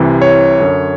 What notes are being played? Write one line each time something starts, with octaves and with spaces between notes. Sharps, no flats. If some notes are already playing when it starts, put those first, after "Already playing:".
Already playing: C2 C3 E3
C#5
F#2 D3